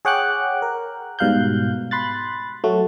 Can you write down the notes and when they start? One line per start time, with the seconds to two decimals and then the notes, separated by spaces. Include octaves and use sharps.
0.05 G#4 C#5 F#5 G5 D6 F#6
0.62 A#4
1.19 G#2 B2 G3 F5 F#6 G6
1.91 B5 C6 F#6 A6
2.64 F#3 A3 F#4